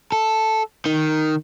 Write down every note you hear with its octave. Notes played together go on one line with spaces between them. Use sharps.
A4
D#3